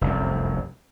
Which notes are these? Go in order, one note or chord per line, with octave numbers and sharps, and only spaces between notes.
F1 C2 F#2